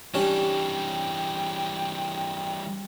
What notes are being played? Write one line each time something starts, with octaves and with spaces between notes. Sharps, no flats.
E3 G3 C#4 D4 G4 G5